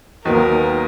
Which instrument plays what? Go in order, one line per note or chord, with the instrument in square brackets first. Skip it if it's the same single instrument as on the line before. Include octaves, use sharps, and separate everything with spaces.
[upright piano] D#2 D#3 F#3 B3 [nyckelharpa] A#4